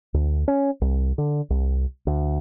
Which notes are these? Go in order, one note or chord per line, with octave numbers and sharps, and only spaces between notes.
D2
C#4
C2
D3
C2
D2